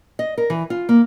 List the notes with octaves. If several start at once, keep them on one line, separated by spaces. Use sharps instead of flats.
D#5
A#4
E3
F4
A#3